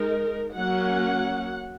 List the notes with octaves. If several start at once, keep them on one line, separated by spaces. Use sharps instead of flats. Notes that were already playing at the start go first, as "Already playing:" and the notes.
Already playing: G#3 D#4 A#4
F#3 A#3 C#4 F#5